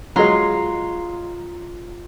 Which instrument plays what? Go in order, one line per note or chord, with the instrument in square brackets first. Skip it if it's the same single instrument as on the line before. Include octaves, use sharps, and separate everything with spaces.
[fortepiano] F#3 G#3 [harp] F4 A#5 C6